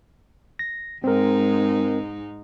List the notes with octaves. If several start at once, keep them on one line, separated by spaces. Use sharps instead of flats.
A#6
G#2 G#3 C4 D#4 A#4